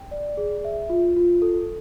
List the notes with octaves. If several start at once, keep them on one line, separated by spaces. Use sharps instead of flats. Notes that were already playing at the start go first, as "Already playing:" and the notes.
Already playing: G5
D5
G#4
E5
F4
F4
A4